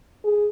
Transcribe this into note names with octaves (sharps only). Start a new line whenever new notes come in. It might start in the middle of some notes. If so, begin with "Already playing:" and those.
G#4